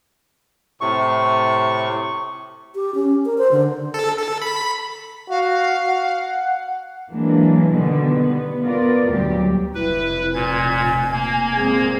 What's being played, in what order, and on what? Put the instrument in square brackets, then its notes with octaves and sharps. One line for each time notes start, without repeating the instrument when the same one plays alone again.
[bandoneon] A2 C3 C#6
[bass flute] G4
C#4
A#4
C5
D3
[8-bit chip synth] A4
A4
B5
[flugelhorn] F#4 [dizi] F5
[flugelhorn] F#5
[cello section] E3 F#3 G#3 A#3 D4
B2 D3 D#3 G3 B3
B3
B3 F4 A#4 D5
D2 A#2 F#3 G3 G4
[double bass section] F1 [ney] E4 [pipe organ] B4
[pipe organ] A#2 G#6 [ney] G#5
[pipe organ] A#3 G#6
[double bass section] A#2 G#3 C4 [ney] G#4